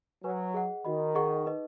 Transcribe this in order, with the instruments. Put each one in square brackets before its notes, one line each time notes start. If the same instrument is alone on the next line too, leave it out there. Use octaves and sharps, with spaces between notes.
[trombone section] F#3 [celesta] B4 G#5 C#6
[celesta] G#4 D#5 F#5
[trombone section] D#3 [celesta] F#4 D#5 B5
[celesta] G#4 D#5 F#5 C#6
D#4 B4 D#5